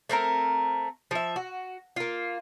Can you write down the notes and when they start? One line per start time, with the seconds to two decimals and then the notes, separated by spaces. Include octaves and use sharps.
0.09 A3 C4 A#4 A#5
1.11 F3 E5
1.36 F#4
1.96 A#3 F4